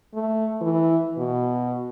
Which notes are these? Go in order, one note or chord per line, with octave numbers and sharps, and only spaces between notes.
A3
E3
B2